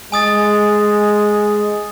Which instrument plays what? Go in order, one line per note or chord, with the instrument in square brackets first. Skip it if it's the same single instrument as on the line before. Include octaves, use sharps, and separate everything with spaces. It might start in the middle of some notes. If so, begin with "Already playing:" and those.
[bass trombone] G#3 [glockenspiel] G#5 D#6 A6